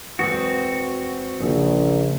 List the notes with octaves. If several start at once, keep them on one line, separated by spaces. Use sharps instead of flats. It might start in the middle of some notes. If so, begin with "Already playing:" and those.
E1 G#3 C4 F#4 B4
A#1 C#3